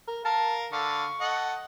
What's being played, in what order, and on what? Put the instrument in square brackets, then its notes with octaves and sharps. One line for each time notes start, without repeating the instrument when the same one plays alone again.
[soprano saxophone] A#4
[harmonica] A#4 F5 [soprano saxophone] A5
[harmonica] D3 A4 F5 [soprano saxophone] C#6
[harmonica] A4 D#5 F#5